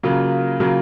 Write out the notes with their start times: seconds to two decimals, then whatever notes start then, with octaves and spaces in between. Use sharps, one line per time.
0.03 C#3 F#3 A#3 F4
0.60 C#3 F#3 A#3 F4